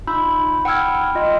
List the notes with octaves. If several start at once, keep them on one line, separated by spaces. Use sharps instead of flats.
D#4 F4 B5 E6 G6
F#5 G5 B5 E6 F6 G#6
F4 D#5